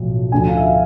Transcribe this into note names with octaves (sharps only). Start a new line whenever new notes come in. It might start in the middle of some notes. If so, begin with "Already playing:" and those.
Already playing: B1 A2 F3
D2 D3 F3 G#5
F5
E5
F5